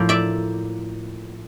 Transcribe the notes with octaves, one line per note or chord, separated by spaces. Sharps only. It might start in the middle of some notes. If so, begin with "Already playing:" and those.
Already playing: A2 F3 A#3
D5 E5